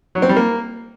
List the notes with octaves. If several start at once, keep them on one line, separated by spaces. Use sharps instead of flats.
F#3
C4
G3
A#3